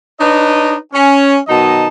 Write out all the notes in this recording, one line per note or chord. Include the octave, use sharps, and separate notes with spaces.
D4 D#4 B4 C#5 D#5
C#4
B2 D#3 F#3 D#4 D#5 A5